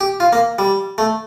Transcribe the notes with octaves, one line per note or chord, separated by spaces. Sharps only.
G4
F4
A#3
G3
A3